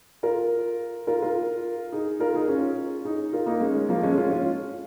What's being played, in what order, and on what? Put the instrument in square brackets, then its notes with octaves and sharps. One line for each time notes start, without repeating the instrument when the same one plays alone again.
[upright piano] F4 A#4
F4 A#4
F4 A#4
D#4 G#4
F4 A#4
D#4 G#4
C#4 F4
D#4 G#4
F4 A#4
A#3 D#4
G#3 C#4
F3 A#3
G#3 C#4
C#4 F4
C#4 F4